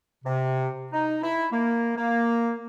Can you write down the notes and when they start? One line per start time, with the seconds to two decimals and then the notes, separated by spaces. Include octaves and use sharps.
0.24 C3
0.92 D#4
1.22 E4
1.52 A#3
1.96 A#3